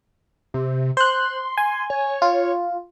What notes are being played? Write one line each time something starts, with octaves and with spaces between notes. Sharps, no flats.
C3
C5 C6 F#6
G#5
C#5
F4